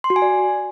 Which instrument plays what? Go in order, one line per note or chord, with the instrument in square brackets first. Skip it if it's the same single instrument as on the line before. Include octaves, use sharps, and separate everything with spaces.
[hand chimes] C6
F#4
G#5
D5